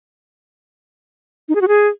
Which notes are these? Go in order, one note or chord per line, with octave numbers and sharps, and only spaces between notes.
D#4
G#4
F#4
G#4